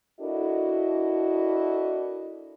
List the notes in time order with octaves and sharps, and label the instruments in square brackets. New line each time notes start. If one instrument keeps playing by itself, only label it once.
[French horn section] D4 E4 F#4 A4 A#4 D#5